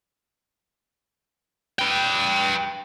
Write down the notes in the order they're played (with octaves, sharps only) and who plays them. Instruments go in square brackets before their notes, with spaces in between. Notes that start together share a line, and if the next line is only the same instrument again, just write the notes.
[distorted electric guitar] B4 G5